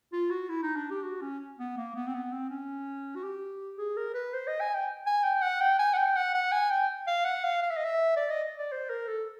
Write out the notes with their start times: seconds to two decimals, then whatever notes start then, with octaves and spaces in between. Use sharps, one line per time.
0.13 F4
0.31 F#4
0.49 E4
0.63 D#4
0.76 D4
0.91 G4
1.04 F#4
1.22 C#4
1.59 B3
1.77 A#3
1.95 B3
2.07 C4
2.14 B3
2.32 C4
2.50 C#4
3.16 F#4
3.24 G4
3.78 G#4
3.97 A#4
4.14 B4
4.34 C5
4.47 D#5
4.61 G#5
4.75 G5
5.06 G#5
5.24 G5
5.42 F#5
5.61 G5
5.79 G#5
5.94 F#5
5.97 G5
6.16 F#5
6.34 F#5
6.52 G#5
6.71 G5
7.07 F5
7.25 F#5
7.44 F5
7.63 F5
7.70 E5
7.77 D#5
7.85 E5
8.17 D5
8.30 D#5
8.58 D5
8.72 C5
8.90 A#4
9.08 A4